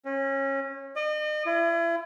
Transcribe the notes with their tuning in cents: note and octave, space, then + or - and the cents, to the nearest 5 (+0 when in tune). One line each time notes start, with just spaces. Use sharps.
C#4 -25
D#5 -40
E4 +35